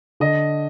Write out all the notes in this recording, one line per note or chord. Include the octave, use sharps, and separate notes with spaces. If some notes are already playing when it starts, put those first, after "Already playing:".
D3 D#5